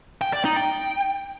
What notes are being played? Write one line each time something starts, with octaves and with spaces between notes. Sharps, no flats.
G5
D5
D#4
G5